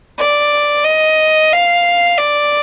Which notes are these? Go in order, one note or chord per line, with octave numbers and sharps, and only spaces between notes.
D5
D#5
F5
D5